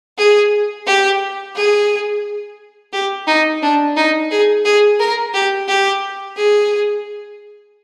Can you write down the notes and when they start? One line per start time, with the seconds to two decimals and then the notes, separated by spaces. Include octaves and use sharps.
0.18 G#4
0.86 G4
1.56 G#4
2.93 G4
3.27 D#4
3.62 D4
3.96 D#4
4.31 G#4
4.65 G#4
5.00 A#4
5.34 G4
5.68 G4
6.36 G#4